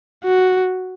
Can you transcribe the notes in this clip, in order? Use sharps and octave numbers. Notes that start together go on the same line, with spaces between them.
F#4